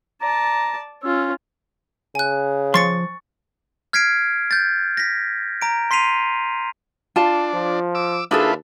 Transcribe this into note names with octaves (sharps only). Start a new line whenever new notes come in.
D5 A5 A#5
C#4 F4 E6
C#3 G#5 F#6
F3 C6 C#6 A6 C#7
F6 G#6 B6 C7 D7
G6 A6
A#6 B6
A#5 D7
C6 B6 C7 D#7 F7
D4 F4 A5
F3
D6 E6
D#2 D4 E4 F4 G#4 A4 B4